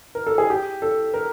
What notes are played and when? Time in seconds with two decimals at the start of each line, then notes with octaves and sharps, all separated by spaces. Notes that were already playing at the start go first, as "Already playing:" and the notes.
0.15 A#4
0.27 A4
0.38 G#4
0.50 G4
0.82 A4
1.14 A#4